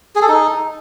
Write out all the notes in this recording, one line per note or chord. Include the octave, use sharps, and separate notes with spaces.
G#4
A4
D#4